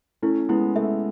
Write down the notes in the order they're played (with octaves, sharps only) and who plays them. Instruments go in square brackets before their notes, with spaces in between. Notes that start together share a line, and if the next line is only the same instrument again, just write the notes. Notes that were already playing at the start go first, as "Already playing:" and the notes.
[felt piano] A3 C#4 [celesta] E4
[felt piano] G#3 B3 [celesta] E4
[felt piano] A3 [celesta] E5